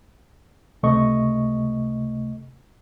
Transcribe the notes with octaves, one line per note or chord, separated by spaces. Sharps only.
C#2 C3 A3 D#5 C#6